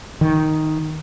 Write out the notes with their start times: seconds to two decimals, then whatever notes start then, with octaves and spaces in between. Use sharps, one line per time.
0.21 D#3